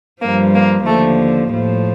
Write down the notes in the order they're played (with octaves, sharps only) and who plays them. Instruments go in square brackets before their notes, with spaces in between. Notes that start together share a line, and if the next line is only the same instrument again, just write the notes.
[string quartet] G2 F3 A#3
A#3
D#2 D3 F3 A3
A2 F3